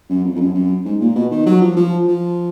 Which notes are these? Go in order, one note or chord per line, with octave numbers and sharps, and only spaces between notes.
F#2
F2
F2
F#2
F#2
G#2
A#2
B2
D#3
F#3
F3
F3
F3